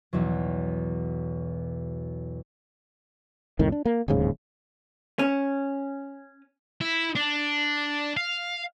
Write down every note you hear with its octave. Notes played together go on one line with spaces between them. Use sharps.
B1 E2 F#3
C2 F2 A2 D#3
D4
A#3
D1 D#2 G#2 C#3
C#4
E4
D4
F5